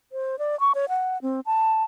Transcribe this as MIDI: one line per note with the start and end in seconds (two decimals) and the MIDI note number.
0.12 0.39 72
0.39 0.59 74
0.60 0.72 85
0.75 0.86 73
0.89 1.21 78
1.22 1.40 60
1.46 1.83 81